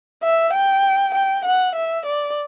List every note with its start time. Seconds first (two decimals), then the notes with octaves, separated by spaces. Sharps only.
0.23 E5
0.54 G5
1.15 G5
1.46 F#5
1.76 E5
2.06 D5